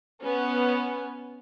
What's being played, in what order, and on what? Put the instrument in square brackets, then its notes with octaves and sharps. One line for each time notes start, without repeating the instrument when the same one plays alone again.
[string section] B3 C#4